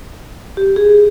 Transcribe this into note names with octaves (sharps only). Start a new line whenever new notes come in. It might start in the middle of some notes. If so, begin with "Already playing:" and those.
G4
G#4